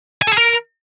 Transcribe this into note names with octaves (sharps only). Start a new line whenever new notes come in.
G#5
A4
G#4
A#4